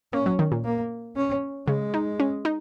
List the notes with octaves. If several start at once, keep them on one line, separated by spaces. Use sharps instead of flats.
A#3 C#4
F#3
D#3
A#2
A#3
C#4
C#3 G#3
D#4
C#4
D#4